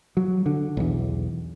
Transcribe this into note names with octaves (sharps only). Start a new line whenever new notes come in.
F#3
D3
B1 E2